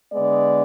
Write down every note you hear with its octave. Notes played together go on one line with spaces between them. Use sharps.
D3 G#3 B3 D5